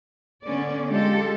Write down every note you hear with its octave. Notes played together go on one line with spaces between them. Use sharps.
D3 B3 C#4 D5
G#3 F4 G4 A4